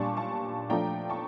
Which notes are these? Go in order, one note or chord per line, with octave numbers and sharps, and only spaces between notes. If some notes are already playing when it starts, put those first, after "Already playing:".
Already playing: A#2 G3 D4 A5 C#6
A5 C#6
F3 A3 D4 G5 A#5
A5 C#6